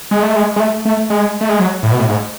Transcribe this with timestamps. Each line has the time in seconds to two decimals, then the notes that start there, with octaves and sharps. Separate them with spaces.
0.11 G#3
0.23 A3
0.36 G#3
0.56 G#3
0.60 A3
0.85 A3
1.10 G#3
1.41 A3
1.49 G#3
1.59 F#3
1.83 A2
1.92 B2
2.00 A2
2.09 G#2